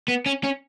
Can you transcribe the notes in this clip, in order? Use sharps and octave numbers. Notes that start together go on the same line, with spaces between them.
B3
C#4
C#4